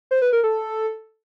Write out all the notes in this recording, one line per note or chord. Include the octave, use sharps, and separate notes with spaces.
C5
B4
A#4
A4